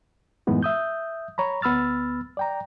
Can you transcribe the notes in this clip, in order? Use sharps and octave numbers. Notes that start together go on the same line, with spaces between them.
F#2 A2 E3 G#3 B3 D#4
E5 D#6 G6
C#5 A#5 B5
D2 B3 B5 E6 F6 A6
D5 G5 A#5